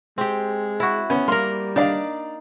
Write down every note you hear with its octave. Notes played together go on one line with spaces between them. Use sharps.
G#3 C4 G4
E4 F#4
B3 C#4
G3 A#3 A#4 C6
D4 D#4 D5 F5